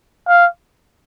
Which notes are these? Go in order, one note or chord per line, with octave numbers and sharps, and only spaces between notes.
F5